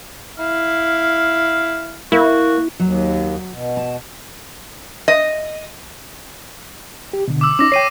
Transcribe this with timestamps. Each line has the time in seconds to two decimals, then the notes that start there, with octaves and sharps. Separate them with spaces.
0.39 E4 F5
2.12 A#3 E4 F#4
2.80 D#2 F#3
3.51 B2
3.77 A5
5.08 D#5
7.13 G4
7.28 B2 D3
7.41 D6 E6
7.59 C#4 D#4 D6 A#6
7.72 C#5 G5 C7 D#7